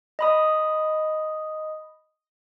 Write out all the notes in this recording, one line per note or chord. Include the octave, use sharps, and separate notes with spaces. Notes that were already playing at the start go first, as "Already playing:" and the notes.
D#5 B5 D#6